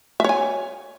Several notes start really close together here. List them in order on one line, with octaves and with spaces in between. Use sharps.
E5 C#5 G#5